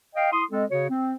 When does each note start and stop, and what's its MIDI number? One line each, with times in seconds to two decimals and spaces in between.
0.15 0.30 75
0.15 0.30 77
0.15 0.30 79
0.32 0.43 64
0.32 0.43 84
0.32 0.43 87
0.51 0.65 56
0.51 0.65 60
0.51 0.65 69
0.51 0.65 75
0.70 0.87 49
0.70 0.87 66
0.70 0.87 73
0.89 1.16 60